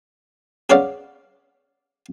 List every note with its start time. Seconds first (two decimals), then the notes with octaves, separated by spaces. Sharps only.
0.70 G#4 B4 C#5 D5 F5 F#5